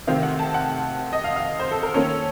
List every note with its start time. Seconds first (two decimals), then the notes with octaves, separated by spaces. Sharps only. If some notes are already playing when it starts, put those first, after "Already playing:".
0.07 C3 D#3 A3 C4 F5
0.23 F#5
0.39 A5
0.54 F#5
1.13 D#5
1.24 F5
1.36 F5
1.60 C5
1.71 A4
1.83 A#4
1.94 D#3 A#3 C#4 A4